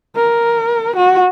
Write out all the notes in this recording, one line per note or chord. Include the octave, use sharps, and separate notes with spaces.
A#4
F#4